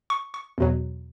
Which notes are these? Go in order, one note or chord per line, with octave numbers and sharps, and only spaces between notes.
C#6
C#6
E2 B2 F#3